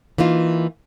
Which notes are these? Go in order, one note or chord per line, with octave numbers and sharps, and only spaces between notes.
E3 A#3 D#4 F4